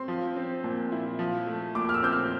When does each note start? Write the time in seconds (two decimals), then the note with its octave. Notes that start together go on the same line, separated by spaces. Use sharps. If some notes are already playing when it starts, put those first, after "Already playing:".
Already playing: C4 C6
0.08 F3
0.36 C4
0.64 A#2
0.92 E4
1.19 F3
1.47 A3
1.75 A#2 D6
1.89 F6
1.94 E6
2.03 C4 G6
2.12 F6